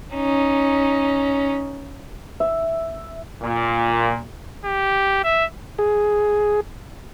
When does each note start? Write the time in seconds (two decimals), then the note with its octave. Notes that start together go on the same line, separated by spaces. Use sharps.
0.14 C#4 D#4
2.40 E5
3.42 A#2
4.65 G4
5.24 E5
5.79 G#4